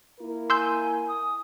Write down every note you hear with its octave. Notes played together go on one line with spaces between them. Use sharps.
A#3 E4 A#4
G#5 C6 E6 G6
D#6